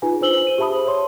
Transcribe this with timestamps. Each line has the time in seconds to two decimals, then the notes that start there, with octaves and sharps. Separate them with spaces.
0.02 D#4 F4 G#4 B4 G#5
0.21 D4 F4 C5 E6 F#7 G7
0.45 C5 D#7
0.58 G4 G#4 E5 A5 B5 D#6
0.74 C5
0.87 C#5 C6